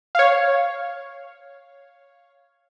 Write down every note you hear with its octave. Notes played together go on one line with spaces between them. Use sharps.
C#5 F5